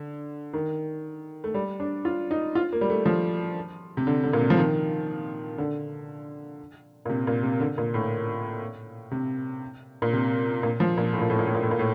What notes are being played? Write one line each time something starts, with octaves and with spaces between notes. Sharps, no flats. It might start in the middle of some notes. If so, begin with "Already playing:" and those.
Already playing: D3
D#3
A3
G3
D4
F4
D#4
F4
A#3
G3
A3
F3
C3
D3
D3
A#2
C3
F3
D#3
D3
A#2
C3
A#2
C3
D3
A#2
A2
C3
A#2
C3
A#2
F3
A#2
A2
A#2
A2
A#2
A2
A#2
A2
A#2
A2